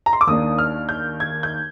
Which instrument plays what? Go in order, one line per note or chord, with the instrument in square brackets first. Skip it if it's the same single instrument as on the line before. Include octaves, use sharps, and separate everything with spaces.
[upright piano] A#5
C6
D6
D#2 D#3 A#3 D4 D#6
F6
G6
G#6
G6